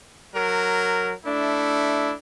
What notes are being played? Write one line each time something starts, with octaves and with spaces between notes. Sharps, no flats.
F#3 A#4
A3 D4 E4